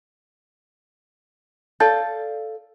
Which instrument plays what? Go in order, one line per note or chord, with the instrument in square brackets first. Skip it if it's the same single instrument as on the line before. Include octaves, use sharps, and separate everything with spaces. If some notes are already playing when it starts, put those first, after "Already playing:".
[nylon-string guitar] A4 D5 F5 [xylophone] A5 G6 A6